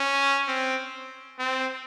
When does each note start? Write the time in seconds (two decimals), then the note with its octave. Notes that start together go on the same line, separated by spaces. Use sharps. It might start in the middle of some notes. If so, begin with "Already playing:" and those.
Already playing: C#4
0.48 C4
1.39 C4